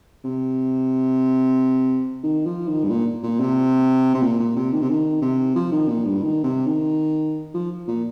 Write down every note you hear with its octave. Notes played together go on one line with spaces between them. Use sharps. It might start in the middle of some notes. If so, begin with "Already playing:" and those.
C3
D#3
F3
D#3
G2
A#2
A#2
C3
C3
A#2
A#2
C3
D#3
C3
D#3
C3
F3
D#3
A#2
G2
D#3
C3
D#3
F3
A#2